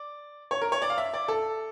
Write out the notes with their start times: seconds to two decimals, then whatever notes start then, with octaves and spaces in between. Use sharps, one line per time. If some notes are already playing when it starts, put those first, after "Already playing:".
Already playing: D5
0.51 C#5
0.62 A#4
0.72 C#5
0.82 D5
0.90 F5
0.98 E5
1.14 D5
1.28 A4